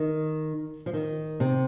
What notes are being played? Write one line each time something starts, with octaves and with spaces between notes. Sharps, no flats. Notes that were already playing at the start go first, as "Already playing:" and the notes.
Already playing: D#3
F3
D#3
C3